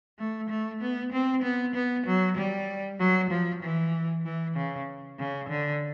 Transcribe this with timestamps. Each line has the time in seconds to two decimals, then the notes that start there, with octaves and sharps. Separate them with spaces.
0.19 A3
0.50 A3
0.81 B3
1.12 C4
1.43 B3
1.75 B3
2.07 F#3
2.37 G3
2.99 F#3
3.30 F3
3.63 E3
4.25 E3
4.56 C#3
5.19 C#3
5.49 D3